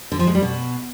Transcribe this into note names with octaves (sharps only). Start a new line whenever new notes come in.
D3
F3
G#3
G3
B2